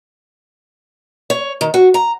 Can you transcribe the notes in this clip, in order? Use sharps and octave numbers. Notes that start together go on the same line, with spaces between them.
C#5
D#3
F#4
A#5